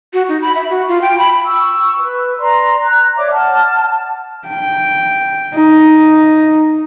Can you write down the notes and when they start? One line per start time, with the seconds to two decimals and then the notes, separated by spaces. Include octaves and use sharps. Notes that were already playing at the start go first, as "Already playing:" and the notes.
0.13 F#4
0.29 D#4
0.41 B5
0.56 E5
0.70 F#4
0.88 F4
1.02 G5
1.18 B5
1.46 C#6 E6
1.99 B4
2.39 B4 D5 A#5 C6
2.83 A#5 F#6
3.17 C#5 D5 E5 D6
3.31 F#5 A5 F6
4.48 G5
5.54 D#4